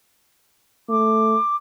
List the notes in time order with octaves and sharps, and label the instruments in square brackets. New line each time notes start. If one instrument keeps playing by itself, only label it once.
[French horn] A3 [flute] D6